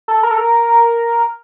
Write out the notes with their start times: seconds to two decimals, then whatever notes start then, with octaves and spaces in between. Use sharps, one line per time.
0.08 A4
0.23 A#4
0.31 A4
0.38 A#4